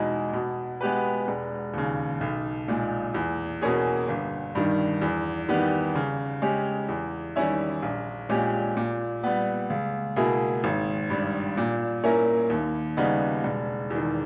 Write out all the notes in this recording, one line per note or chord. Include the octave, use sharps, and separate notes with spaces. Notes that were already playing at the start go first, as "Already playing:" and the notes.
Already playing: E2 B2 G#3 D#4
B2
G#3 B3 G4 B4
E1
D#2 C#3
B1
A#2 G#3
E2
B2 A#3 C#4 G#4
G1
G2 D#3
E2
D#3 G3 B3 G4
C#3
G#3 C#4 G4
E2
D#3 G3 C#4 E4
A#1
A#2 G#3 C#4 G4
A#2
G3 B3
C#2
B2 A#3 E4 G#4
G#1
G2 G3
A#2
A#3 C#4 E4 A#4
D#2
C#3 G3 B3 D#4
E1
E2 D#3